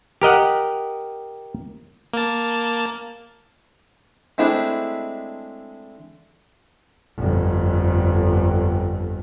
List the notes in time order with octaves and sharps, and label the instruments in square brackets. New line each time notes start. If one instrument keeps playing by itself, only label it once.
[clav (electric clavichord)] G4 A#4 D#5 F#5
[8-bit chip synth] A#3 A5
[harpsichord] G#3 A3 C4 D4 E4
[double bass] G1 F2